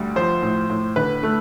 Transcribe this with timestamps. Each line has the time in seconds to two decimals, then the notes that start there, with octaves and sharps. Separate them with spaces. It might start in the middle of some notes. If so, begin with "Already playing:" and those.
Already playing: D2 G3
0.16 F3 C5
0.42 A2
0.70 A2
0.96 D3 B4
1.23 A3